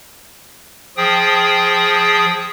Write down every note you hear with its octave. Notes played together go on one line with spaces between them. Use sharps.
F3 G#4 G5 D#6